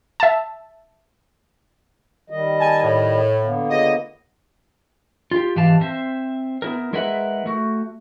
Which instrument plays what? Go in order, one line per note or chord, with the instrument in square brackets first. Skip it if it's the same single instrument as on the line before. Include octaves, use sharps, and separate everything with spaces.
[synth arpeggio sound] E5 A5
[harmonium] D#3 G3 D#5
[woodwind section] G#5 A5
A2
[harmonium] D3 A#3 B3
[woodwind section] C#2 D#5
[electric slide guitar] F4 G4
G#2 E3 G4 F5 A5
C4 C5 E5
B3 E4 A#4
G#3 E4 A#4 B4 E5 F#5
A3 F#4